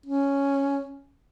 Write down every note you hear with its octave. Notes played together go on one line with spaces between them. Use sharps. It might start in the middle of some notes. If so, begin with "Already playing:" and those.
C#4